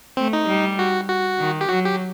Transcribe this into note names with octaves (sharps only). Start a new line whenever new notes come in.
A3 C4
D#4
G3
F#4
F#4
D#3
G4
F#3 F#4
G4